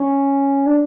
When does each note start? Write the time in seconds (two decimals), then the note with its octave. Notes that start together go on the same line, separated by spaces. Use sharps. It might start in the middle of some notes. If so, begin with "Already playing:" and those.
Already playing: C#4
0.66 D4